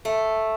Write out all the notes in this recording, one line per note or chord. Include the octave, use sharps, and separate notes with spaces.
A3